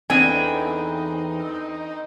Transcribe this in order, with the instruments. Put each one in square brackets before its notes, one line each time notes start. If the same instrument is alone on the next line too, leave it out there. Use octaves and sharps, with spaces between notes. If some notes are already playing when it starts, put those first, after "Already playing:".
[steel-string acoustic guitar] E2 E3 G5 [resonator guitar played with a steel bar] D3 B3 C4 [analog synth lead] D#4 [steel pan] G#5